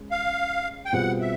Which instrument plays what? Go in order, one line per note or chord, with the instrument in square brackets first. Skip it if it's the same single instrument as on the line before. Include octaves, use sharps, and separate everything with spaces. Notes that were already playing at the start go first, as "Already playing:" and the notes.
Already playing: [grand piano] G#3 C#4
[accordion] F5
G5
[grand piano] B2 G3 C4 F4 G#4 [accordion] F#5
[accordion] E5